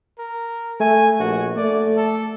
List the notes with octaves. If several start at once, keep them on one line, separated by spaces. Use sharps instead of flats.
A#4
A3 G#5
A#1 F#4
A3 D5
A4